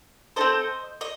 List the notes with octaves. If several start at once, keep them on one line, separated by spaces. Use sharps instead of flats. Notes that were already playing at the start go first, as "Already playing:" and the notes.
C4 D#4 A4 C5 D#5
D#5